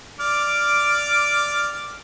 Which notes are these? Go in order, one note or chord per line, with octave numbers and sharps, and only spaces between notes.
D5 D6 F6